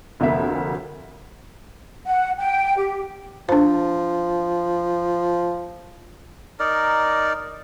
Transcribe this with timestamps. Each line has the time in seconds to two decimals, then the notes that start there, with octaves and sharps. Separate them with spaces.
0.20 F1 D2 A#3 E5
2.06 F#5
2.37 G5
2.76 G4
3.49 F3 D4 C5
6.60 D#4 A#4 D5